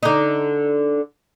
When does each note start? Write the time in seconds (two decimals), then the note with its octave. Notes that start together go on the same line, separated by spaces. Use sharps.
0.03 D3 D#4